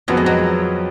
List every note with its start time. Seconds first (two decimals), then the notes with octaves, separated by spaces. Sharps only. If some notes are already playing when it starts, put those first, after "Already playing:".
0.08 F2 F3 F#3 B3 F#4
0.17 G#3
0.26 F#3